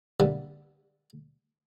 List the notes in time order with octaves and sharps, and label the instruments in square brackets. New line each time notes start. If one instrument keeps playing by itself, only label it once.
[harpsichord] C2 G2 D3 G3 A#3 B3